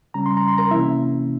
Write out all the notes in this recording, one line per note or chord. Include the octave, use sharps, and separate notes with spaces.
C#3 G3 C#4 A#5
C6
A#5
C6
A#4 A#5
C3 E3 A#3 C#4 E4 E5